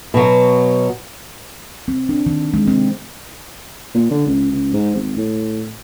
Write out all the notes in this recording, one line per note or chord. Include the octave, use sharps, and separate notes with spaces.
B2 F#3
C4
D4
D#3
G#3
C4
A#2
D3
C#2
C#2
G#2
G#1
A2